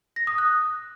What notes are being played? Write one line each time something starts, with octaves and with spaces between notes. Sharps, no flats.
A#6
D#6
F#6